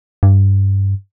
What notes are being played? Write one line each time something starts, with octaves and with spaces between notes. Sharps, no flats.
G2